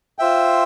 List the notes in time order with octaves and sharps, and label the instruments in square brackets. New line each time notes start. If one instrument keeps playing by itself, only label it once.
[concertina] F4 C5 E5 G5